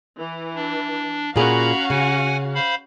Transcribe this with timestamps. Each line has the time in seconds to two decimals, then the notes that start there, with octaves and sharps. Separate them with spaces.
0.18 E3
0.55 D4
1.36 A#2 C#4 F#4 G#4 F5 A#5 B5
1.90 C#3 F#5 G#5
2.55 C5 F5 B5